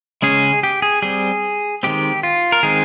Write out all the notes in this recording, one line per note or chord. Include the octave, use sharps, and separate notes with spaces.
C#3 G#3 C#4 G#4
G4
G#4
G3 C4 G#4
D#3 G#3 C4 G4
F4
A#4
D#3 G#3 C4 G#4